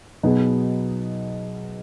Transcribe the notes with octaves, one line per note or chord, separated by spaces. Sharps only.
B2 F#3 B3 D#4 G#4